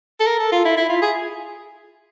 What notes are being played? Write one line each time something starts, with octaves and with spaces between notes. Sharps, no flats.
A4
A#4
A4
F4
E4
E4
F4
G#4